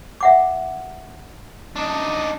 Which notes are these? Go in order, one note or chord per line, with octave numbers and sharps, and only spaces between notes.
E5 F#5 D6
D4 D#4